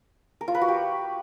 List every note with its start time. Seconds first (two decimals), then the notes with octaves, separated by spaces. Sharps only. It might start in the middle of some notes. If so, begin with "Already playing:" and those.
0.41 A#4
0.48 F4
0.55 B4
0.61 F#4
0.68 G4